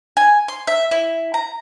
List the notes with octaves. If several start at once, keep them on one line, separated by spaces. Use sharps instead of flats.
G#5
C6
E5
E4
A#5